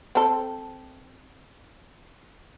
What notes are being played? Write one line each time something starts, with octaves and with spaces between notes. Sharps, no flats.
C4 A4